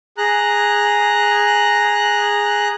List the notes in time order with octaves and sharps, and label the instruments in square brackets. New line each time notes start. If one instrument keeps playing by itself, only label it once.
[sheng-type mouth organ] G#4 A#5 F#6